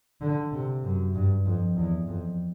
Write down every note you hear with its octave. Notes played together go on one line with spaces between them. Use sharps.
D3
C3
F#2
G2
F2
E2
F2